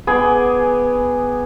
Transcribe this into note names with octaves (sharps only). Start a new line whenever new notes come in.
B3 G#4 G5 D6